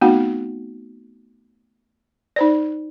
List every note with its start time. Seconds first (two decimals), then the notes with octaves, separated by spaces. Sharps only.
0.01 A3 B3 C4 D#4 F#4
2.36 D#4 C5 D5